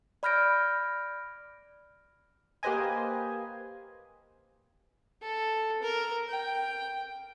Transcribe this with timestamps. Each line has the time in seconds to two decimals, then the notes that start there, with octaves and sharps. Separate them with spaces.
0.23 D5 B5 F6 G6 A#6 D7
2.63 A#3 G4 B4 C5 D#5 G#5
5.22 A4
5.82 A#4
6.29 G5